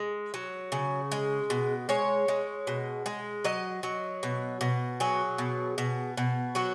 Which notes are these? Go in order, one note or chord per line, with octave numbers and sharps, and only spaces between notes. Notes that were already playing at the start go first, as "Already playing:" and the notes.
Already playing: G#3
F#3
C#3
G#3
B2
G#3 C#5
G#3
B2
G#3
F#3 D#5
F#3
B2
B2
F#3 G#4
B2
B2
B2
F#3 F#4